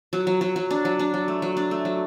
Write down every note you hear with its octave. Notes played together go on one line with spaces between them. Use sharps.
F#3
F#3
F#3
F#3
D4
F#3
D4
F#3
A3
F#3
D4
A3
F#3